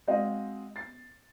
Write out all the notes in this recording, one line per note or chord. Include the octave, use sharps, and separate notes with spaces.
G#3 C4 F#4 D#5 F5
A6 C7